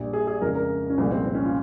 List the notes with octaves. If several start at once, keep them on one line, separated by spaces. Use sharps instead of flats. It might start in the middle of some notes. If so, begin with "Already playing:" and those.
Already playing: A#1 A#2 G3
G#4
G#4
F2 C#3 G#3 A#4
A#4
C#4
C2 A#2 F3 G#3 C4
C4
C4
C#4
F4